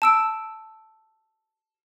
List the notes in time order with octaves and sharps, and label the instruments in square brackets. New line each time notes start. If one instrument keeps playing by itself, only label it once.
[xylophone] A5 E6 D7